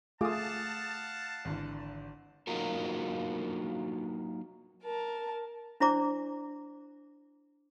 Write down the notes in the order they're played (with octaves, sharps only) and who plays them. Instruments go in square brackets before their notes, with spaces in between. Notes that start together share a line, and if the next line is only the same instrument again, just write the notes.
[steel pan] A3 F4 G#4 [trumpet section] F5 F#5 A5 [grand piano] D6 D#6
[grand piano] G#1 D3 E3
[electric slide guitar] F#3 A#3 D#4 F4 F#4 A#4
[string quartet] A#4 A5
[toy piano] D4 E4 C5 D5 A#5 D6